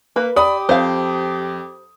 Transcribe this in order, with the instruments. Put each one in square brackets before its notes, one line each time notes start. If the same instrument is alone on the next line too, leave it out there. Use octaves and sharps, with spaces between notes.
[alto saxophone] A#3 [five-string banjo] B4
[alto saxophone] G4 [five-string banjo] D5 [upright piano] B5 D#6
[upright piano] F2 [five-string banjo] C5 F5